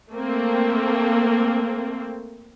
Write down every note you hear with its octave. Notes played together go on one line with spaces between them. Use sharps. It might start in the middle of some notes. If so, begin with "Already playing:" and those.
A3 A#3 C4